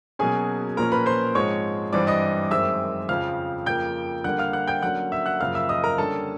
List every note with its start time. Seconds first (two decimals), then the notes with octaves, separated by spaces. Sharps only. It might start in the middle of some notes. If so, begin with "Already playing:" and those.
0.19 B2 F#3 A#3 C#4 G#4 G#5
0.77 A#2 F3 A#3 C#4 A#4 A#5
0.92 B4 B5
1.06 C5 C6
1.35 G#2 F3 G#3 C4 C#5 C#6
1.93 G2 E3 G3 C4 D5 D6
2.07 D#5 D#6
2.51 F#2 D#3 G#3 C4 E5 E6
3.09 F2 C#3 F3 F5 F6
3.66 F2 C#3 F3 A#3 G5 G6
4.24 D3 G3 A#3 F#5 F#6
4.39 F5 F6
4.53 F#5 F#6
4.67 G5 G6
4.82 D3 F#3 A#3 C#4 F#5 F#6
5.12 E5 E6
5.26 F#5 F#6
5.40 F#2 C#3 F3 A#3 F5 F6
5.55 E5 E6
5.69 D#5 D#6
5.84 A#4 A#5
5.98 D3 G3 A#3 C#4 A4 A5